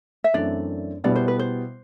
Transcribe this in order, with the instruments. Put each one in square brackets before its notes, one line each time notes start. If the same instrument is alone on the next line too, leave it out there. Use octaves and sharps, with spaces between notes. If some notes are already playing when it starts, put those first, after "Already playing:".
[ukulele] E5
[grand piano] F#2 E3 A3 C4 [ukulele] D4 D5
[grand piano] B2 G3 B3 E4 [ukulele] D4 D5
[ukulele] C5
B4
C5